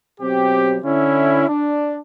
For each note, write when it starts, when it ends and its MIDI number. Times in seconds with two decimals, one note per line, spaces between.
0.21 0.79 47
0.21 0.79 54
0.21 0.79 60
0.21 0.79 67
0.84 1.45 50
0.84 1.45 61
0.84 1.45 64
1.48 1.97 62